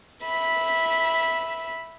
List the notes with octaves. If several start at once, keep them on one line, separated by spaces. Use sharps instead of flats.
E5 B5